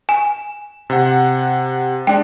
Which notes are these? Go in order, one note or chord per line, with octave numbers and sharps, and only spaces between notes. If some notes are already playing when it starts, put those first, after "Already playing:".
G#5 E7
C3 F#5
G#3 D4 G5